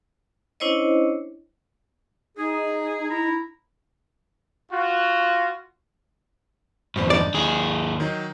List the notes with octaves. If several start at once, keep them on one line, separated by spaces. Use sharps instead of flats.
C#4 D4 E4 C5 C#5 D#5
D#4 G#4
E4 A#5
F4 F#4
E2 G2 B2 C5 B5
D4 D#4 D5
D#2 D#4 G#4 D#6
D#3 F#3 D#4